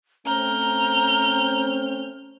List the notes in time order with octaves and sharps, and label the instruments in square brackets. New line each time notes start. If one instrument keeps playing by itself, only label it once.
[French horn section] A3 C4 C#4 [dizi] A#5 [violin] F6 G6